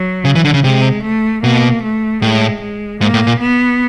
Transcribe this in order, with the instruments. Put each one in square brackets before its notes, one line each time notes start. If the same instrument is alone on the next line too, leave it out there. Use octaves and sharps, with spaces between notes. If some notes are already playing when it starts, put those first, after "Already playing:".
Already playing: [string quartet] F#3
[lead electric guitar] C#3
E3
D3
C#3
[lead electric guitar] C3 [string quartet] G#3
[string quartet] A3
[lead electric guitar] B2 [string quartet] A#3
[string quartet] A3
[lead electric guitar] A2 [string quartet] G#3
[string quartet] G#3
[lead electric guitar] G#2 [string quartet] A#3
[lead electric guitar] A2
A#2
[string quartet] B3